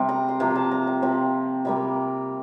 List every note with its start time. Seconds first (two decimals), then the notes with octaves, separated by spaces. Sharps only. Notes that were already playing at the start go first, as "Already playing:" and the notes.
Already playing: C3 G3 C4
0.09 A#5
0.28 C6
0.40 C3 F3 A#3 A#5
0.56 A5
0.71 A#5
0.87 G5
1.02 C3 F3 C4
1.65 C3 G3 A#3 G5